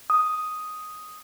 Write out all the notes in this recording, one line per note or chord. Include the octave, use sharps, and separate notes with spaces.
D#6